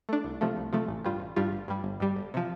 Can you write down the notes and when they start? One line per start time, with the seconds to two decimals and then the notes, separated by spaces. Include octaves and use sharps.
0.09 A3 D4
0.24 C2
0.41 C3 F3 A3
0.57 C2
0.73 C3 F3 A3
0.88 A1
1.05 G2 G3 F4
1.20 A1
1.36 G2 G3 F4
1.53 G1
1.68 G2 G3
1.84 G1
2.00 G2 G3
2.16 G1
2.34 C3 F3